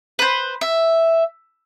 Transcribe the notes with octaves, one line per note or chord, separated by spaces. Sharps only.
B4 C5
E5